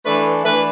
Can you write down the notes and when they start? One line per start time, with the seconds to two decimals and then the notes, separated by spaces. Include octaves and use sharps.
0.05 E3 A3 D4 B4
0.43 E3 A3 D4 B4